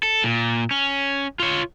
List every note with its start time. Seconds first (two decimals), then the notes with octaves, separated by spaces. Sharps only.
0.03 A4
0.23 A#2
0.71 C#4
1.39 F4 C#5